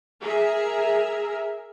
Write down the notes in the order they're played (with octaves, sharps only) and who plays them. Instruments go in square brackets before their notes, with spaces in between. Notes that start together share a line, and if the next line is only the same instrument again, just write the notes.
[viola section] G#4 A#4 E5